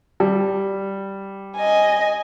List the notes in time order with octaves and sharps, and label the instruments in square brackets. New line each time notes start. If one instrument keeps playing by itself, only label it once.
[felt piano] G3
[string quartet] D#5 G#5